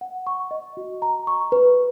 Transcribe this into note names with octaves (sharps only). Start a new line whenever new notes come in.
F#5
C#6
D#5
F#4
A#5
C#6
B4